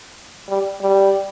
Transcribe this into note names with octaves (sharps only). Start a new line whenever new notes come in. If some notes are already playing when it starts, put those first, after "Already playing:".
G3
G3